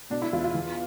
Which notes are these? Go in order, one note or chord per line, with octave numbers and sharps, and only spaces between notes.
B2 D4
E4
E2 F4
F4
E3